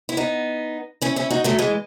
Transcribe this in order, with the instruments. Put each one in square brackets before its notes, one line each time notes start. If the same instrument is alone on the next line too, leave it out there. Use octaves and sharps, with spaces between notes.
[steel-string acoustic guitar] E4
B3 D#4
C#4 E4
C#4 E4
D#4 F#4
F#3 A3
E3 G#3